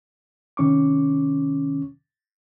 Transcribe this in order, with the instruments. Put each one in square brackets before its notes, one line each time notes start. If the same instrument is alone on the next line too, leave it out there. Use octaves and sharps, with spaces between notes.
[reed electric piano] C3 D#3 C#4 C#6 D6